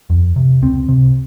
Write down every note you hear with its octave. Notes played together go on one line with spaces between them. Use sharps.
F2
C3
C#2 C4
C3